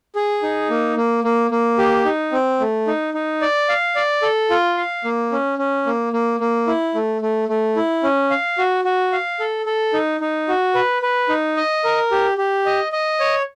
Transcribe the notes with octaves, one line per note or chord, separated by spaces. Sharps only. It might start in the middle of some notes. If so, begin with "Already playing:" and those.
G#4
D#4
A#3
A#3
A#3
A#3
G4
D#4
C4
A3
D#4
D#4
D5
F5
D5
A4
F4
F5
A#3
C#4
C#4
A#3
A#3
A#3
E4
A3
A3
A3
E4
C#4
F5
F#4
F#4
F5
A4
A4
D#4
D#4
F#4
B4
B4
D#4
D#5
A#4
G4
G4
D#5
D#5
C#5